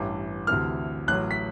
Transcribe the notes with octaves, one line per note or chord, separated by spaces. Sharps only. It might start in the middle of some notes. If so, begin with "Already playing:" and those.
Already playing: A1 G2 E3
D2 C3 E3 F6
A1 A2 F#3 F#6
B6